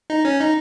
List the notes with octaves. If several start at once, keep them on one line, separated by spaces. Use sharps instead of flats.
D#4
C#4
D#4